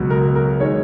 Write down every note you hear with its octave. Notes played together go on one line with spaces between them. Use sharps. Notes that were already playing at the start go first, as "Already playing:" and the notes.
Already playing: C#2 B2 F#3
A#4
A#4
D#3 G#3 C#5